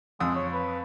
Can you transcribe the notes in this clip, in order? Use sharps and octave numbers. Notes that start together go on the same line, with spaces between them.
F2 G#3 D#6 E6
C#5
B4